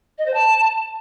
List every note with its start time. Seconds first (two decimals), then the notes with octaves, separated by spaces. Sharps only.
0.18 D#5
0.26 C5
0.34 A5